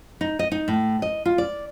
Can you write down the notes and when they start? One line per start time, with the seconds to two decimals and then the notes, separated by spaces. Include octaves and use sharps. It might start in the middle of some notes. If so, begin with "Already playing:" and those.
0.21 D#4
0.39 D#5
0.52 D#4
0.68 A2
1.02 D#5
1.25 F4
1.38 D5